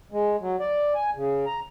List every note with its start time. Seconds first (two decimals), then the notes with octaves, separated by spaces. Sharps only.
0.12 G#3
0.40 F#3
0.60 D5
0.95 G#5
1.15 C#3
1.46 A#5